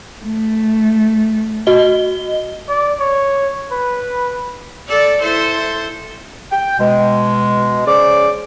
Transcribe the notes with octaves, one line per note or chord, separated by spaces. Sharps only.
A3
F#4 D#5 G7
D5
C#5
B4
A4 D5
E4 A4 C5
G5
B2 G#3
C#3 C5 D5 D6